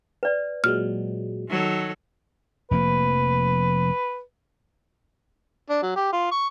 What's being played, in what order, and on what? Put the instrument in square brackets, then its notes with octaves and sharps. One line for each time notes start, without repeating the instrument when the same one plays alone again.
[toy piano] B4 D5
[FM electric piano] A#2 F#3 G#3 [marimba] F6
[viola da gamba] D#3 F#3 A4
[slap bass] F1 F3 A#3 [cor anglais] B4
[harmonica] D4
F#3
G4
F4
C#6